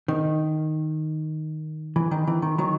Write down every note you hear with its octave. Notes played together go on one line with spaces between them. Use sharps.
D#3
E3
D#3
E3
D#3
D#3 F#3